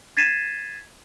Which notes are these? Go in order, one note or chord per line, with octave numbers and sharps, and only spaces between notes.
G#6 A6 B6 C7 D#7 E7